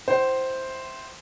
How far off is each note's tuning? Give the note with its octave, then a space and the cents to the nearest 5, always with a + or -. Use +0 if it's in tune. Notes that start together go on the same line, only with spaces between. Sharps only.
E4 +0 C5 +0 G5 -40